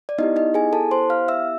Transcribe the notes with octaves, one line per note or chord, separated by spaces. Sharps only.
D5
B3 D#4 E4 G4 D#5
D#4 D#5
G#4 G#5
A4 A5
C5 C6
F5 F6
E5 E6